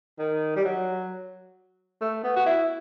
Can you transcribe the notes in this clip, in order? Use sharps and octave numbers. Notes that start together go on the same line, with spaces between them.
D#3
G3
F#3
A3
B3
F#4
E4